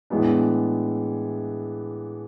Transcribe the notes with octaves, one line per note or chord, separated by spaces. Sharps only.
A2 E3 G#3 B3 D4